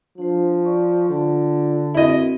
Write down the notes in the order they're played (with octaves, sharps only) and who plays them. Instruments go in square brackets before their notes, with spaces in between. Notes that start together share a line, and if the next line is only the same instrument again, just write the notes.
[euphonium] F3 [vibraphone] D4 C5
[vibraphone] D5 C#6
[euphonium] D3 [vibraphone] F4 D5 A5
[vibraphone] C4 F#4 A#4 [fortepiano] E4 D#5